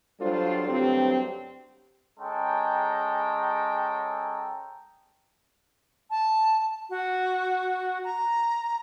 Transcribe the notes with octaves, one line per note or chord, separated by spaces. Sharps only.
F#3 G3 D4 F4 A4 C5
D2 G2 F#3 C4 G4
G#3 C#4 A4 G5 A#5
A5
F#4
A#5